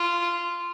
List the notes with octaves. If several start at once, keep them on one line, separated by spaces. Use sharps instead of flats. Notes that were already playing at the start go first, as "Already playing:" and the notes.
Already playing: F4